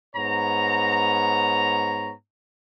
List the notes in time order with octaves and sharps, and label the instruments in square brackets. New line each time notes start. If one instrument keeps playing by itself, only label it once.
[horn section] G#2 B3 C#5 A#5